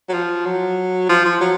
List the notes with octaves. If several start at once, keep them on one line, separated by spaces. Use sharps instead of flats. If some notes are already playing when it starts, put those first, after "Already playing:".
F#3
F3
F#3
F3
F3
F#3